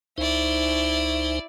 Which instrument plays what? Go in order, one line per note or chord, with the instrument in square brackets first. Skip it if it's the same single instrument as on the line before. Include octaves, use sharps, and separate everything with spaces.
[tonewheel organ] C#2 D#4 C5 [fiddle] E4 D5